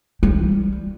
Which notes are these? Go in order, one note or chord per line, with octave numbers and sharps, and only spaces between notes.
G3